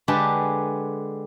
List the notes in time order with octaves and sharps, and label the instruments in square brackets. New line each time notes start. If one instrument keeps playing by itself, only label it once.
[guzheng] D3 G#3 G4 B4 A5